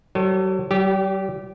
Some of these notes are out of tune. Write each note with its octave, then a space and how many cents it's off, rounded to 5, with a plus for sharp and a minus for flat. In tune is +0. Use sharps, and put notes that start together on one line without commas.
F#3 +45 A4 +25 C#5 -35
G3 -45 G4 -5